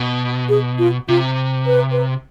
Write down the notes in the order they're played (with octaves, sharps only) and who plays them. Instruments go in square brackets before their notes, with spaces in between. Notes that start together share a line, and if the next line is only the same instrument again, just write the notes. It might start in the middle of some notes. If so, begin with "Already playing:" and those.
Already playing: [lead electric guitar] B2
[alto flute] G#4
F4
[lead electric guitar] C3 [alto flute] F4
[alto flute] B4
B4